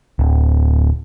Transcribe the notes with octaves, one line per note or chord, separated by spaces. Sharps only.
D1